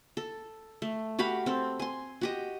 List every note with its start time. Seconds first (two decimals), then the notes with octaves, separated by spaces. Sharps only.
0.17 A4
0.82 A3
1.19 F#4 G4 F5 B5
1.46 C4 A4
1.79 G#5 C6
2.21 F#4 G4 D#5